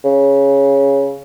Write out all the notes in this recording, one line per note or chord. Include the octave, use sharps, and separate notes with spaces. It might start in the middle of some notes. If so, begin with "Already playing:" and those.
C#3